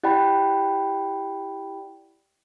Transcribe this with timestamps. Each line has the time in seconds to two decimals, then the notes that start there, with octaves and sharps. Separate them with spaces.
0.03 E4 G4 D5 F#5 G5 B5